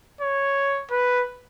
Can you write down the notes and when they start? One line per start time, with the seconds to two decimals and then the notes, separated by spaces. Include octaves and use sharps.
0.21 C#5
0.91 B4